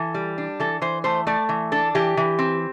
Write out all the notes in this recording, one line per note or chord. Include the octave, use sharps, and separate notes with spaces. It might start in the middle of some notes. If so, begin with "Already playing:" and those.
Already playing: E3 A4
G3
D4
E3 A4
E3 C5
A3 C5
A3 D5
E3
D4 A4
E3 G4
E3
C4